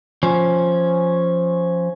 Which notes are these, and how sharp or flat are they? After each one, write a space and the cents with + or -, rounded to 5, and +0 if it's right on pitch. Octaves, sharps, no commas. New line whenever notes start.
F3 +0 C#4 +0